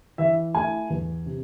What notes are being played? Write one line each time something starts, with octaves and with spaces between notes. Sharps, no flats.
E3 E5
A3 E4 G#5
E2
C3